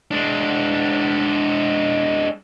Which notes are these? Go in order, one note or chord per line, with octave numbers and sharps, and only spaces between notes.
G#3 D4